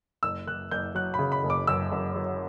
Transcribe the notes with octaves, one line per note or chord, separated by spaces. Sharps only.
F#1 E6
F#1 F#6
F#1 G6
F#3 F#6
B5
C#3
B5
F#1
D6
F#2 E6
F#2
F#3